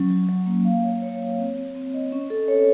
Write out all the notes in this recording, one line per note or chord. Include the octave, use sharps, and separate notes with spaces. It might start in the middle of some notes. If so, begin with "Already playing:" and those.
Already playing: F#3 C#4
F#3
F#3
A#3
F5
C#5
C#5
C#5
C4
C4
C4
D#5
C#4
A4
C#5